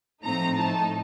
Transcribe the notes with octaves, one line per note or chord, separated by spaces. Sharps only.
A2 F3 A3 C4 D#4 A#5
A2 A3 D#4 A5